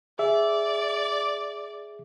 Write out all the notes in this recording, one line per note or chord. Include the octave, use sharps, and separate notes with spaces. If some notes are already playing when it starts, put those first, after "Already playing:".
G#4 D5 E5